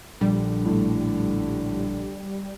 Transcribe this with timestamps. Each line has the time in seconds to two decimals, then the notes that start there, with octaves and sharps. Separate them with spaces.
0.21 A#1 D3 G3
0.65 A2